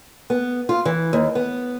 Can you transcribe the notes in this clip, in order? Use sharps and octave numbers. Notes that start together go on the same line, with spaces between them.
B3
F4
E3
D#2
B3